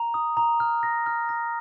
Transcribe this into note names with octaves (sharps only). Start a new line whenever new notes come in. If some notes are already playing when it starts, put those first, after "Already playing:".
Already playing: A#5
D#6
A#5
F6
A#6
F6
A#6